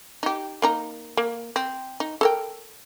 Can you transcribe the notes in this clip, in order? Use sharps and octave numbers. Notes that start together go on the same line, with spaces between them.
D#4 G4
A#3 D#4 A#5
A#3
C4
D#4
A4 A#4 G5